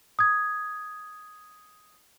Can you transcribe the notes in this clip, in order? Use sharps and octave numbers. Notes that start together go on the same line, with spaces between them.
D#6 G#6